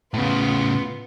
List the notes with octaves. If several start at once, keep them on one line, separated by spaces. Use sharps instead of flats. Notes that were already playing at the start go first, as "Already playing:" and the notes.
A2 C#3 B3 F4